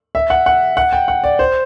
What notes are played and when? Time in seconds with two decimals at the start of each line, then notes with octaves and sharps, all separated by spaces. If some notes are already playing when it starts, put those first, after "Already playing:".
0.15 E5
0.30 F#5
0.46 F#5
0.77 F#5
0.92 G5
1.08 F#5
1.24 D5
1.39 C5